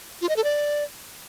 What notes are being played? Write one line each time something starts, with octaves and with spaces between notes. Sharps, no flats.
F4
D#5
A4
D5